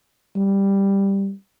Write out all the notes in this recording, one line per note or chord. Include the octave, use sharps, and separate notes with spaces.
G3